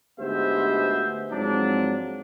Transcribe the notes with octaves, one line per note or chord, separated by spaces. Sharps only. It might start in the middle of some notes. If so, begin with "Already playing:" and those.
D2 G#2 B3 G4 C5 E5
G#2 F3 F#3 C4 D4